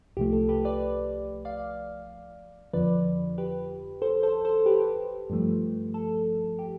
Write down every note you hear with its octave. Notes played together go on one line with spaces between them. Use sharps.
C2 C3 F3 A3 G4
A4
G4 B4
B4 D5
D5 F5
F2 D3 F3 B4 D5
G4 B4
A4 C5
A4 C5
A4 C5
G4 B4
G2 F3 A3
A4
G4